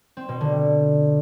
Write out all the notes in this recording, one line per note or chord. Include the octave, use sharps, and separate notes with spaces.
C4
B2
D3